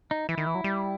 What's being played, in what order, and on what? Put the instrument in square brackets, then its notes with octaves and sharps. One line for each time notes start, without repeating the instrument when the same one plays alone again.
[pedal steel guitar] D#4
[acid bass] E3 [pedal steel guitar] E4
[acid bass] D#3
E3
F#3
G3